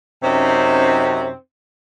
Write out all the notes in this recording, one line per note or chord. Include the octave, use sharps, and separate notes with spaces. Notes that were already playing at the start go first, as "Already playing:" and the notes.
F#2 C3 C4 C#4 D#4